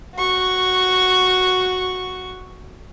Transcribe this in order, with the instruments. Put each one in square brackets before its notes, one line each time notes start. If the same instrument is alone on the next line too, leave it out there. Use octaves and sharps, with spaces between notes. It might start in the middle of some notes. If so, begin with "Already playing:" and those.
[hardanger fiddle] F#4 C#6